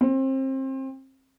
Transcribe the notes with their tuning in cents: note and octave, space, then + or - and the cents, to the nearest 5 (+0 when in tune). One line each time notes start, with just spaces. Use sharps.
C4 +30